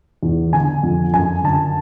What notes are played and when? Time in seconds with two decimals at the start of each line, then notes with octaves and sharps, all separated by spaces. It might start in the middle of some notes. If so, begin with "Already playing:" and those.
0.23 E2
0.53 D3 G#5
0.83 F2
1.14 F#2 G#5
1.44 D3 A5